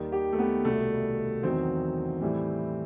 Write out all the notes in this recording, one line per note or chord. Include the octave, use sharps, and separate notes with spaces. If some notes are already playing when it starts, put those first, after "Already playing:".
Already playing: D#2 D#3 G3
G4
A3
B3
C2 B2 G3 A3
E2 D#3 F#3 C4
A2 E3 G3